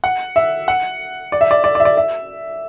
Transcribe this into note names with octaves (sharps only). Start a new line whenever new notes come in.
F#5
E5
F#5
D5
E5
D5
D5
D5
E5
D5
E5